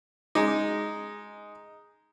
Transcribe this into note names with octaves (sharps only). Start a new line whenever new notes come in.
G#3 D#4